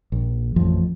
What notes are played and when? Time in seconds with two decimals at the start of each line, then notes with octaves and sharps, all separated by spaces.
0.12 A#1
0.56 A1 F2 F3